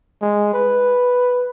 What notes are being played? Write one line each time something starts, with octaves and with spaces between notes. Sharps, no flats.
G#3
B4